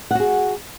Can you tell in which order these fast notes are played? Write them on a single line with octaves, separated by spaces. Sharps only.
F#5 F#4 G#4